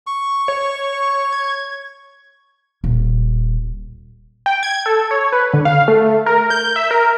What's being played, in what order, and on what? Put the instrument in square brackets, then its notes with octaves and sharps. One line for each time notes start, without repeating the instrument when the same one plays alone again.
[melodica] C#6
[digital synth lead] C#5
G#6
[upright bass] D#1
[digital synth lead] G5
G#6
A4
C#5
B4
D3
F5
A3
A#4
G6
E5
A#4